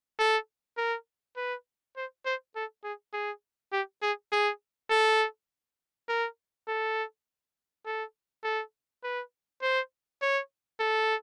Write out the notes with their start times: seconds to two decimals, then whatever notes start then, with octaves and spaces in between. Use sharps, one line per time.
0.19 A4
0.78 A#4
1.36 B4
1.96 C5
2.26 C5
2.56 A4
2.84 G#4
3.13 G#4
3.73 G4
4.03 G#4
4.32 G#4
4.90 A4
6.09 A#4
6.68 A4
7.86 A4
8.44 A4
9.03 B4
9.62 C5
10.22 C#5
10.80 A4